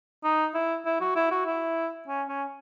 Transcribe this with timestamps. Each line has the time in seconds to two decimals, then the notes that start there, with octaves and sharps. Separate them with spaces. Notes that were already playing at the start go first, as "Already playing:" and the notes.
0.24 D#4
0.55 E4
0.86 E4
1.01 F#4
1.16 E4
1.31 F#4
1.46 E4
2.08 C#4
2.29 C#4